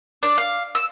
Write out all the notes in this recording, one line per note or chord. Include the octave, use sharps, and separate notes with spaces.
D4
F5
E6